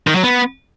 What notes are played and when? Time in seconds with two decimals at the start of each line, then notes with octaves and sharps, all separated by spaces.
0.07 D#3
0.15 F#3
0.23 B3